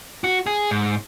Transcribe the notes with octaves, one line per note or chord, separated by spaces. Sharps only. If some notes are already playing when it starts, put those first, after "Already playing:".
F#4
G#4
G#2